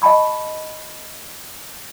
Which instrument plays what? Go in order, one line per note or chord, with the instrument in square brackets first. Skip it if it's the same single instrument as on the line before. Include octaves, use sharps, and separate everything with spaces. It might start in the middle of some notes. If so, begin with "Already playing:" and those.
[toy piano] D#5 G5 A5 B5 C#6